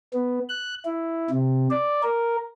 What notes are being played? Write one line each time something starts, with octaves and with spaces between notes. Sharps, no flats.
B3
F#6
E4
C3
D5
A#4